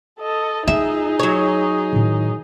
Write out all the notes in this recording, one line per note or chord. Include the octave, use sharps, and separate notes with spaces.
A4 D#5
D#4 F4 G#4 E5
F#3 C#5
A2 D#3